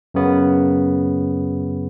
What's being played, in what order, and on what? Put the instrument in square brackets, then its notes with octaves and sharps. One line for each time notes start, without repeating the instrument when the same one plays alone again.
[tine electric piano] F#2 C#3 B3